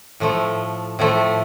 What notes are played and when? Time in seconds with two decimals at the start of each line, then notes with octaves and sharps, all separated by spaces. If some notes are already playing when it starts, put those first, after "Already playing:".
0.20 A2 F3 A3
0.99 A2 F3 A3